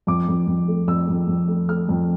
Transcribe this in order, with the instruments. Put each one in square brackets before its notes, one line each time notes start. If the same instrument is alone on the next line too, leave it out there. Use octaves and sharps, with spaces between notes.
[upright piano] F2 D6
F2
F2
A3
F2 E6
F2
F2
A3
A3 F6
F2